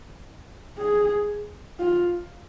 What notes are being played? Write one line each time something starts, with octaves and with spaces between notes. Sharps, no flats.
G#4
F4